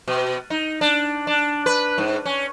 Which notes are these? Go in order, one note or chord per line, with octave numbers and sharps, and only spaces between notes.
B2
D#4
D4
D4
B4
G#2
C#4